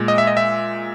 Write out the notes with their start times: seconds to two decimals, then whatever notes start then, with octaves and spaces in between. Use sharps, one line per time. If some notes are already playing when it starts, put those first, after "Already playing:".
Already playing: A#2 G#3
0.08 D#5
0.18 E5
0.27 D#5
0.37 E5